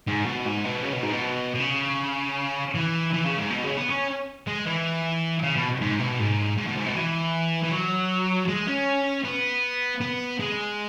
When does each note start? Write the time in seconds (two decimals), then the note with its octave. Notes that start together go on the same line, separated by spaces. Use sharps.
0.07 G#2
0.26 B2
0.46 G#2
0.65 B2
0.83 C#3
0.93 B2
1.03 G#2
1.13 B2
1.55 B2
1.60 C#3
2.74 E3
3.14 E3
3.25 C#3
3.38 G#2
3.51 B2
3.64 C#3
3.77 B3
3.89 C#4
4.47 G#3
4.66 E3
5.42 C#3
5.55 B2
5.81 G#2
5.99 B2
6.19 G#2
6.57 G#2
6.66 B2
6.76 G#2
6.86 B2
6.95 E3
7.64 E3
7.71 F#3
8.48 G#3
8.67 C#4
9.25 B3
10.01 B3
10.40 G#3